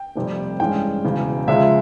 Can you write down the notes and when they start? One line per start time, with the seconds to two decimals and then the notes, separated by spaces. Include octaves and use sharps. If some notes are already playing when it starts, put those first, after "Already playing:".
Already playing: G5
0.16 F1 F2 C3 G3
0.60 G2 E3 G#3 C#4 G5
1.04 E1 E2 C#3
1.48 C#2 C#3 F3 G#3 E5